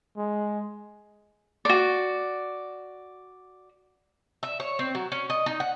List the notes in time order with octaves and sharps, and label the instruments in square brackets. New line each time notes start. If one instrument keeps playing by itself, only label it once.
[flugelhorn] G#3
[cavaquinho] F#4 D5
[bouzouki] E5
C#5
C4
F#3
C#4
D#5
D#4
F#5